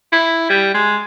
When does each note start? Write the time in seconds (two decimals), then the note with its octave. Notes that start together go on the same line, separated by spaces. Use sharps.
0.12 E4
0.50 G3
0.74 G#3